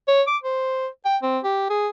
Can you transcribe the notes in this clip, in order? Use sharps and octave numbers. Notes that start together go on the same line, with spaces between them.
C#5
D6
C5
G5
C4
G4
G#4